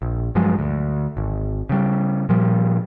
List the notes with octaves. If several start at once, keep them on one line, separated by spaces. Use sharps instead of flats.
A#1
G2 F3 F#3 G#3
D2
G#1
C#3 G3
A#2 F3 G3